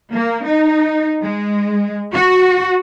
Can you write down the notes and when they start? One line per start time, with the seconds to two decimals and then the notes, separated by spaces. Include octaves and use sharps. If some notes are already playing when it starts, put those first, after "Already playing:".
0.14 A#3
0.46 D#4
1.22 G#3
2.13 F#4